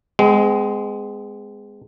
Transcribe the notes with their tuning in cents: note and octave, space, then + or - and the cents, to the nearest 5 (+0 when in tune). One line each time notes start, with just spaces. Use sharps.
G#3 +0 C4 -45